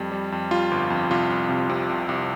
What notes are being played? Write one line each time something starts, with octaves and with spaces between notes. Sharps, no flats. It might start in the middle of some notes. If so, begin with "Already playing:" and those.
Already playing: F2 G3
G3
F2
G3 F4
G1
F2
C2 F4
C2
C3
C3
C2
C2